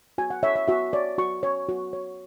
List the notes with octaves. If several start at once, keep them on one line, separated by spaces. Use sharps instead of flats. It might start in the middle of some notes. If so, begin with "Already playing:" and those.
F#4 G#5
F#5
C#5 E5
E5
F#4 E5
C#5 D5
F#4 C#6
C#5
F#4
C#5